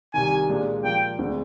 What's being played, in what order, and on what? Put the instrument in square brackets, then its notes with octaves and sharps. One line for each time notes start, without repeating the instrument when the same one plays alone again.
[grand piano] C2 C3 D#3 [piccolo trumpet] G#5
[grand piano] A#2 G#3 D4
[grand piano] A#2 F3 A#3 [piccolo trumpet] G5
[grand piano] D2 D3 G#3 C4